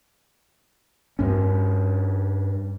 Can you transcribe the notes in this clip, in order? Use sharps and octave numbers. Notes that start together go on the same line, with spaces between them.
G2 C#4